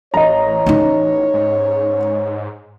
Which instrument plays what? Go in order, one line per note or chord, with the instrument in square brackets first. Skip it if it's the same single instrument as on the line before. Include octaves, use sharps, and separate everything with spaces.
[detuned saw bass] A1 [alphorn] C#5 [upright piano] D#5 A#5
[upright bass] C#4 D#4
[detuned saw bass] G#2